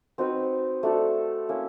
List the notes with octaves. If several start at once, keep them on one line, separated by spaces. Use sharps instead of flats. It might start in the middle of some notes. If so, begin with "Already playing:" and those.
C4 D#4 F#4 B4
A3 D4 F#4 A4
A#3 C#4 E4